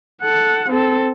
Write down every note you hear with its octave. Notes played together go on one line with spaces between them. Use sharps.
A4 F#5
C4 A4